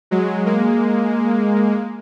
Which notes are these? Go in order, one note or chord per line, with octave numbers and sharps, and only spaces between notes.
F#3 G#3
G#3 A#3